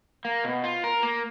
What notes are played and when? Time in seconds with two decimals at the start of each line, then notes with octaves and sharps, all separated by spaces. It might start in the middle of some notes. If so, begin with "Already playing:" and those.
0.25 A#3
0.44 B2
0.64 F4
0.84 A#4
1.03 A#3